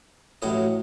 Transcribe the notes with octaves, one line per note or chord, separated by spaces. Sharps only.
A1 A2 F#3 D#5